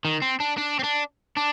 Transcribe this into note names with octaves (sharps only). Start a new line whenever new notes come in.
D#3
C4
D4
D4
C4
D4
D4